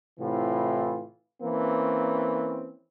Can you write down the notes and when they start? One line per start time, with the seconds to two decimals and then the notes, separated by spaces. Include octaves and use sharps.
0.20 A2 C3 E3 F4
1.43 E3 A#3 C4 C#4